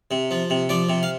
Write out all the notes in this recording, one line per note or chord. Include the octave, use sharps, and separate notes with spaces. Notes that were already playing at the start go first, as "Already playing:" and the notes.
C3
F3
C3
F3 D5
C3
F5